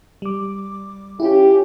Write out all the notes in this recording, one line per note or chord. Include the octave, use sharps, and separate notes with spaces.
G3 D6
C#4 E4 F4 G4